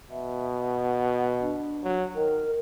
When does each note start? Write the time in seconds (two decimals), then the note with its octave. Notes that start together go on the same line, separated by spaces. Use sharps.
0.11 B2 E5
0.58 F#5
1.41 D4
1.84 F#3
2.15 D#3 A#4